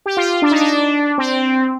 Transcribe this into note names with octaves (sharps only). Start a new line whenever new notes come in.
G4
F4
D4
D#4
D4
C4